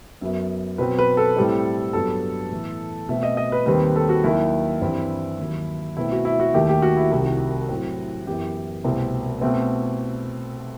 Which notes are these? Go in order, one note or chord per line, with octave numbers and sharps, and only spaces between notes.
F#2 F#3 B3 E5
B2 F#3 C4 B4
B4
A4
A2 G3 C4
G2 F#3 B3 A4
A2 E3 B3
B2 A3 C4 E5
D#5
D#5
B4
D#2 D#3 G3 C4 B4
A4
F#4
D#2 D#3 F#3 E4
G2 E3 G3 C4
D#2 D#3 F#3
B2 A3 C4 E4
F#4
E4
F#4
D#2 D#3 A3 G4
G4
F#4
E4
C2 C3 D#3 F#4
A2 F#3 C4
F#2 E3 B3 G4
C2 B2 A3 C4
B2 A3 C4